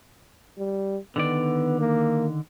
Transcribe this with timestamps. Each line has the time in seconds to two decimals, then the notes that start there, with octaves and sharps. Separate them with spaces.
0.58 G3
1.16 D3 D#3 B3 D5
1.80 A#3